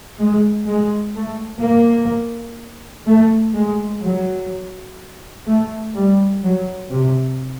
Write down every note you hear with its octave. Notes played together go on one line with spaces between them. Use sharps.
G#3
G#3
A3
A#3
A3
G#3
F#3
A3
G3
F#3
C3